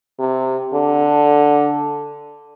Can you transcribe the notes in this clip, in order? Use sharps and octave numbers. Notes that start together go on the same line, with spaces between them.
C3
D3